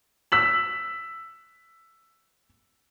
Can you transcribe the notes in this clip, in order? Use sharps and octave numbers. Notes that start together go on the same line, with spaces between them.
E6 B6 F#7